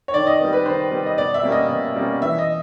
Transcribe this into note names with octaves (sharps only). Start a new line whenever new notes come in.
C#5
D#3 D5
D#5
G3 B3
B4
D#3 C5
G3 B3
D#5
B2 D5
E5
G3 A#3 C#4
D#5
B2
G3 A#3 C#4
E3 E5
D#5